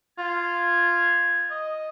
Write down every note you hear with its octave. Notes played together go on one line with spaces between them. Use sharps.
F4 G#6
D#5